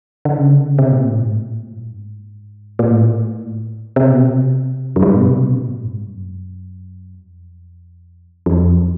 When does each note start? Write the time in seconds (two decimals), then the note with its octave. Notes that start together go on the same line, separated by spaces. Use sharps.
0.25 D3
0.38 C#3
0.52 D3
0.65 C#3
0.79 C3
0.92 A#2
1.05 A2
1.18 G#2
1.31 A2
1.49 A#2
1.67 A2
1.76 G2
1.85 G#2
2.79 A#2
2.90 A2
3.96 C3
4.11 B2
4.25 C3
4.96 F#2
5.02 G2
5.16 B2
5.29 C3
5.42 B2
5.56 A#2
5.68 G2
5.82 G#2
5.95 G2
6.09 F#2
7.15 F2
8.46 F2